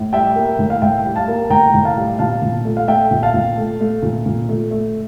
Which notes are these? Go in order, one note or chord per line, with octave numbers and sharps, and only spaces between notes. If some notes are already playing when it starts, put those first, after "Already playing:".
Already playing: A2
G3 E5 G5
A#3
A2
F5
A2 E5 G5
G3
F5 A5
A#3
A2 G5 A#5
A2
F5 A5
G3
A#2 F5 A5
A#2
A3
F5
A3 E5 G5
A#2
F5 A5
A#2
A3
A3
A#2
A#2
A3
A3